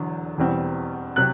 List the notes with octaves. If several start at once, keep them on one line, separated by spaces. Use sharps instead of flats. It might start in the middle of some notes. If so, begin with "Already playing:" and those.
Already playing: E1 E2 D3 F#3
E1 E2 B2 G3 C4
C3 F#3 F#6